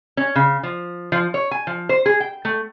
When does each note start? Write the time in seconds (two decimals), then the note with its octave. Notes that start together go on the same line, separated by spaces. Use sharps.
0.17 C#4
0.36 C#3
0.63 F3
1.12 F3
1.34 C#5
1.51 G#5
1.67 F3
1.89 C5
2.06 G#4
2.20 G5
2.45 A3